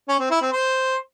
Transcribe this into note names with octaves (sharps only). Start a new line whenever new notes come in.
C#4
C4
E4
C4
C5